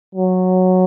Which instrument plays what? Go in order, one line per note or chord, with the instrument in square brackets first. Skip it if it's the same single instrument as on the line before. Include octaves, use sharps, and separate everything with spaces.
[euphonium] F#3